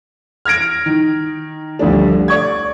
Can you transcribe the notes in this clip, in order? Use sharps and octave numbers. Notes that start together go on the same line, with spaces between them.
F6 G#6 A#6 D7
D#3
D2 F3 G3 A3 D4
D5 C#6 G#6